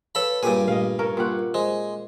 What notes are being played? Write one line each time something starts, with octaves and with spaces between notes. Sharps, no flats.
A4 B4 C#5 F5 B5
G2 A#2 G4 G#4
A#2 G3 A3 D#5 F5
C#4 A4 A#4
A#2 G4 F#5 C6 C#6
G#3 C5